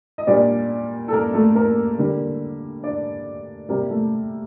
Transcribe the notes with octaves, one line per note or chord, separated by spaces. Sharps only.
D#5
A#2 G3 A#3 D4 D5
A4
A#3 A#4
A3 A4
A#3 A#4
D3 G3 A#3
D4 D5
C3 G3 A#3 A#4
A3 A4